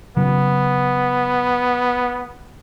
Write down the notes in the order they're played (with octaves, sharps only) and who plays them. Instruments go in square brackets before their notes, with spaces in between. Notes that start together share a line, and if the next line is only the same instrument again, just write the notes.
[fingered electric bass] C#3 F#3 [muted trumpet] B3